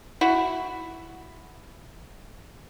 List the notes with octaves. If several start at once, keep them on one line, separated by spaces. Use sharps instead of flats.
E4 F#4